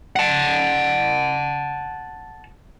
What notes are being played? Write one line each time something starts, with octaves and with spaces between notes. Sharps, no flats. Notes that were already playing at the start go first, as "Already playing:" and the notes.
F#5 A5